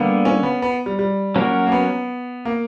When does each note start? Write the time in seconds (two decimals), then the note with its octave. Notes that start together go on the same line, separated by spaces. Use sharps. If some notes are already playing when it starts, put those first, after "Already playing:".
Already playing: D3 G3 A#3 B3
0.25 C#4
0.43 B3
0.62 B3
0.86 G3
0.99 G3
1.35 F#3 A#3 C#4 F#4 A#4
1.67 A#3
1.72 B3
2.45 A#3